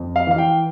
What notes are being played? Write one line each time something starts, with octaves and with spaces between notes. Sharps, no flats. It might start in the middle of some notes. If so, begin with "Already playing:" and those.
Already playing: F2
F5
E3 F5
G5